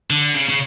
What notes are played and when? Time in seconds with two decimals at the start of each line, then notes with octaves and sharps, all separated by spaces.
0.10 D3
0.34 C#3
0.49 C#3